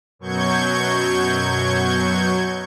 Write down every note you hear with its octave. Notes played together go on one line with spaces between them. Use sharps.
F#2 B2 F#3 C#6 G6 G#6